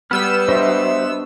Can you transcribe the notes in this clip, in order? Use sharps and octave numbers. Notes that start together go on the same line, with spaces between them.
G3 B3 E6 F6
D4 F#4 C5 D#5 E5